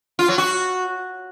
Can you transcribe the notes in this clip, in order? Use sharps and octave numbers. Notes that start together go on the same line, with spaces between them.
F4
F#3
F#4